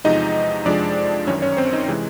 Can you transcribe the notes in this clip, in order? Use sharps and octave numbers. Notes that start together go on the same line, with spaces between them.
E2 C3 F3 G#3 D#4 D#5
F2 C3 F3 G#3 D4 D5
G1 F#2 D#3 C#4 C#5
C#4 C#5
C4 C5
D#4 D#5
C3 E3 G#3